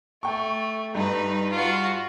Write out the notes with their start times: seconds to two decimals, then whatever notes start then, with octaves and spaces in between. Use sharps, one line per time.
0.23 A3 G5 C#6
0.95 G2 D#4 B4
1.51 F4 F#4